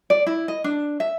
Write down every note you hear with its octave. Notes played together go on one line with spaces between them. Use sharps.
D5
E4
D#5
D4
E5